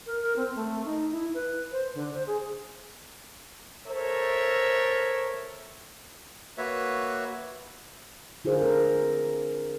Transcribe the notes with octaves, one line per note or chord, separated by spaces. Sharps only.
A#4
A#4
C4
A3
D#4
E4
B4
C5
D3
C5
G#4
A4 A#4 C5 C#5 E5
A#3 F#4 B4 C#5 E5
D3 F4 G#4 A#4 C5
C4 A4 A#4